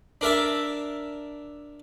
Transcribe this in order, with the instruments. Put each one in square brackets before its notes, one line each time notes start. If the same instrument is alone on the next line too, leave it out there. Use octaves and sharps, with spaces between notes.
[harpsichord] D4 A#4 E5 A5